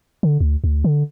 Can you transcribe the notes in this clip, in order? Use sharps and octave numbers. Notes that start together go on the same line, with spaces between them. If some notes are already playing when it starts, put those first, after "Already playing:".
D3
D2
D2
D3